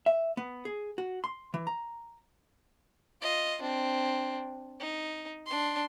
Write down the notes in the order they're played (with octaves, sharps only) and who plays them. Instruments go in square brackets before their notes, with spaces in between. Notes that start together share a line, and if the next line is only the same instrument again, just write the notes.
[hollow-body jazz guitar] E5
B3
G#4
F#4
C6
E3
A#5
[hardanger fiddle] F4 D#5
C4 D4
D#4
D4 C6